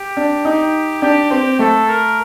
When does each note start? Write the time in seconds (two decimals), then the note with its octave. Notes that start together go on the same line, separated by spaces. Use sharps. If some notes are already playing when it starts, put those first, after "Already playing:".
Already playing: G4
0.17 D4
0.45 D#4 G4
1.02 D4 G4
1.31 C4 G4
1.59 A3 A4
1.88 A#4